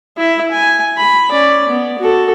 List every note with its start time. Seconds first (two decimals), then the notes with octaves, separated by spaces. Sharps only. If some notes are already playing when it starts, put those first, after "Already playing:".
0.17 E4 E5
0.52 G#5
0.97 B5
1.30 C#4 D5
1.69 B3
1.99 F#4 A4